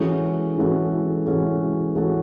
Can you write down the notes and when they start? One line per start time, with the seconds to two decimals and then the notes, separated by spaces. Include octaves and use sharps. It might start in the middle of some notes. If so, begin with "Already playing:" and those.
Already playing: E3 G#3 C#4 F#4 A4
0.58 E3 G#3 C#4 F#4 A4
1.26 E3 G#3 C#4 F#4 A4
1.95 E3 G#3 C#4 F#4 A4